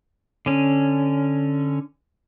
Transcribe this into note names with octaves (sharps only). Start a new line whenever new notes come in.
D3 C#4